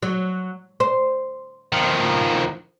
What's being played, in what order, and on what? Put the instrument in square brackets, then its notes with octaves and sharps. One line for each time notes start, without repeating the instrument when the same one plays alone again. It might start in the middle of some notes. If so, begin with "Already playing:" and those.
[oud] F#3
C5
[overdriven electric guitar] D#3 F3